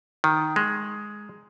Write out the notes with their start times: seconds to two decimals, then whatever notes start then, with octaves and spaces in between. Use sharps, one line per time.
0.24 D#3
0.56 G#3